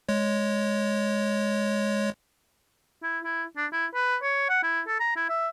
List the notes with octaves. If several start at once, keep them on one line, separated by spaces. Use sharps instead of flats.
G#3 C#5
E4
E4
D4
E4
B4
C#5
F#5
E4
A4
A#5
E4
E5